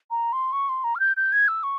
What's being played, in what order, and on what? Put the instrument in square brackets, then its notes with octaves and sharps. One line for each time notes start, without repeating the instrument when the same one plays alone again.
[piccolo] A#5
C6
C#6
C6
A#5
F6
G6
G6
G#6
E6
C#6